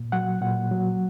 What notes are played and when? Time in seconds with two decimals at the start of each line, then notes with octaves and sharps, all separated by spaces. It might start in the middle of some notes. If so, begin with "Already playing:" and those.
Already playing: A#2
0.12 F#3 F#5
0.41 A#2 F#5
0.71 F#3